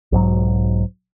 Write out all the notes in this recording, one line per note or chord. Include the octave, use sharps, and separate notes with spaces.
B1 G#2 F#3